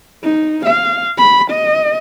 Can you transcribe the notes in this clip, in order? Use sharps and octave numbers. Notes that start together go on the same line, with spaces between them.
D#4
F5
B5
D#5